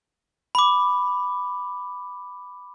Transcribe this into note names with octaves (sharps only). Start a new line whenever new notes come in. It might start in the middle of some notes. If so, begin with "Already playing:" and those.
B5 D6